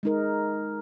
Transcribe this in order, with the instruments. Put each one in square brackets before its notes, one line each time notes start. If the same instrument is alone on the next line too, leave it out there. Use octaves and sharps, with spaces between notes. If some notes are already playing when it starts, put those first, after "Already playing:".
[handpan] G#3 D#4 A#4